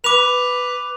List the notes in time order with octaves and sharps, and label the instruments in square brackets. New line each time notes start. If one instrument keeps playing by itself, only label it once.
[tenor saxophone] B4 [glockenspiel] D6 F7